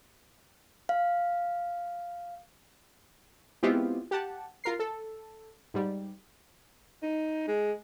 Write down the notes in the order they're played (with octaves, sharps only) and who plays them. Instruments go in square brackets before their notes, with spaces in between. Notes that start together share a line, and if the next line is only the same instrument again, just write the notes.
[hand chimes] F5
[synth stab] G#3 B3 C4 E4 F4 G4
G4 F#5 A5
F4 A#4 C7
A4
G#2 G3
[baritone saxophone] D#4
G#3